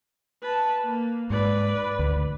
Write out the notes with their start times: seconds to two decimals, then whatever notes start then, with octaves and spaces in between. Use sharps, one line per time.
0.43 B4 A5
0.84 A#3
1.30 G#2 B4 D5
1.99 D2